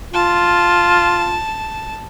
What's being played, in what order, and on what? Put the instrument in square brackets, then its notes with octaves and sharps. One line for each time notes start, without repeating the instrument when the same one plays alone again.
[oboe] F4 [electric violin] A5